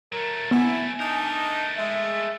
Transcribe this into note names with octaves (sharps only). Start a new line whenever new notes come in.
F#3 A3 A#4
B3 E4 G#5
A3 D4 D#4 A#4
G#3 E5